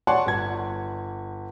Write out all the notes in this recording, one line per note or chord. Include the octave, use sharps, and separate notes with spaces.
C#5 D5 F#5 G#5 A5 C6
G1 G#6